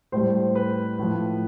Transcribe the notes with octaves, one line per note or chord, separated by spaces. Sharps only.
A2 G3 C5
B4
A2 F3